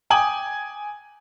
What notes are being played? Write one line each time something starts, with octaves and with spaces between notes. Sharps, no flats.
G5 G#5 D6 D#6 F#7